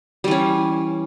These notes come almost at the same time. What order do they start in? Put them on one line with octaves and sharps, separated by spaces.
G3 E3 C#4